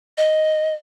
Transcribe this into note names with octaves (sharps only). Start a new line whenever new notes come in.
D#5